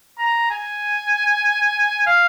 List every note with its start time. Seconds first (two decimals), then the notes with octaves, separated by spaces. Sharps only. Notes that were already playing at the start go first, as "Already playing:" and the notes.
0.19 A#5
0.51 G#5
2.07 F5